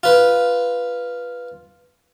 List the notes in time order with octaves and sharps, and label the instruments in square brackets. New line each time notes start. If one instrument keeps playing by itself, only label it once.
[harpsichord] F4 B4